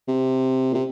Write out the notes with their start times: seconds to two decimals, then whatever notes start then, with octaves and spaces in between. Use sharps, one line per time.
0.08 C3
0.71 A#2
0.75 C3